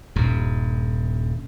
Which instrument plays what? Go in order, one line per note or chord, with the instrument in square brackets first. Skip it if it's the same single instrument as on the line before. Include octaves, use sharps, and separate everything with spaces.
[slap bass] D#1 G2